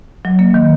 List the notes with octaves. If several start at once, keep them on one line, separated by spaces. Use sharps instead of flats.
F#3
A#3
D#3